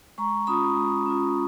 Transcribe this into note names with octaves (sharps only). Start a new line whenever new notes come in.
G#3 A#5 C#6
C#4 F4 B5 D#6
G#3
C#4 F4